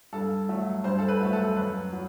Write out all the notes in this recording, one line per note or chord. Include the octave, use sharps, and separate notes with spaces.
G2 A4
F#3 A3
G2 C5
A4
B4
F#3 A3
A4
F#2 B4
F#3